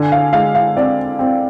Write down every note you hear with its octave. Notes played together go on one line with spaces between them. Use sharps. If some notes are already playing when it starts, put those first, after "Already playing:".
Already playing: D3 G#5
F5
G#3 F5
F5
C4 D5
C4